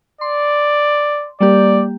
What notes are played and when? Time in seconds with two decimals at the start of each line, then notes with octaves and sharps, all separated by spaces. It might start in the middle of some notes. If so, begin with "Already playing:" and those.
0.21 D5 C6
1.40 G3 A#3 G4 D5